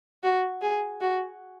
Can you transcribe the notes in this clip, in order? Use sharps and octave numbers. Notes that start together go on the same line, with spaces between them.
F#4
G#4
F#4